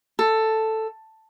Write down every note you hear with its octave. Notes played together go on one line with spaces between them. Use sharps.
A4